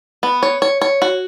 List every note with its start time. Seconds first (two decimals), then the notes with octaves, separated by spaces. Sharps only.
0.23 B3
0.43 C#5
0.62 C#5
0.81 C#5
1.02 F#4